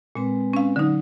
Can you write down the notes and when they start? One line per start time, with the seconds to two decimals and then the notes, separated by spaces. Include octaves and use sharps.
0.15 A#2 G#3 C4 B4
0.53 C#4 F5
0.76 D3 F#3 D#4